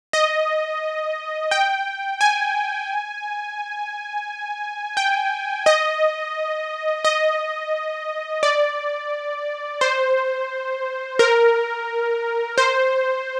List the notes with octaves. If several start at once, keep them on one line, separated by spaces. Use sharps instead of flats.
D#5
G5
G#5
G5
D#5
D#5
D5
C5
A#4
C5